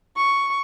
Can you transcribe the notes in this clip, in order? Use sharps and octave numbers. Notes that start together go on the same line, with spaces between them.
C#6